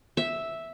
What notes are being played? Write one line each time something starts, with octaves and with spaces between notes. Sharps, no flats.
E5